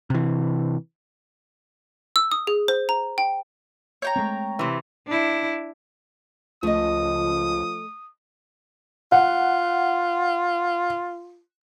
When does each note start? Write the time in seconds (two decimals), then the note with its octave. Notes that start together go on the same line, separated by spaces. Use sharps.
0.10 C3 E3
2.16 E6
2.32 D#6
2.47 G#4
2.68 C5
2.89 A#5
3.18 G5
4.02 C#5 G5 A#5
4.16 G#3 A3 C4
4.59 C3 E3
5.08 D4 E4
6.63 C#2 F3 A3 D#5 D#6
9.12 F4 F#5